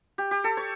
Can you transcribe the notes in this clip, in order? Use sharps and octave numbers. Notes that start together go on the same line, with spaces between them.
G4
G4
A4
C#5